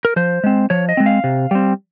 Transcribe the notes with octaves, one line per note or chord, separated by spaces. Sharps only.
A#4
F3 C5
G#3 C4
F3 C#5
D#5
G#3 C4
F5
C3
G3 C4